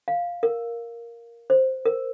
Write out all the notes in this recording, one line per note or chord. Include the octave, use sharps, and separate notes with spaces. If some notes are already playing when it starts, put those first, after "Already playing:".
F5
A#4
C5
A#4